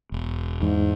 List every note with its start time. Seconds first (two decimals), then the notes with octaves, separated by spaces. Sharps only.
0.12 E1
0.62 E2 G#2